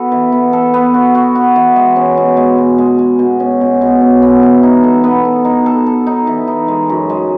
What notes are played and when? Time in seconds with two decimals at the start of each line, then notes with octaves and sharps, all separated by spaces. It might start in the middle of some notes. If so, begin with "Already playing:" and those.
Already playing: B3 F#4 A4
0.12 E3
0.32 B3
0.53 A4
0.74 B3
0.94 F#4
1.15 F#4
1.35 F#4
1.56 E3
1.76 G#3
1.96 C#4
2.17 B2
2.37 G#3
2.58 B2
2.78 G#3
2.98 G#3
3.19 B2
3.40 C#4
3.61 B2
3.81 B2
4.01 C#4
4.22 B3
4.43 E3
4.63 D#4
4.84 A4
5.04 B3
5.25 A4
5.45 D#4
5.66 A4
5.87 A4
6.07 D#4
6.27 E3
6.48 D#4
6.68 G#3
6.89 F#2
7.09 G#3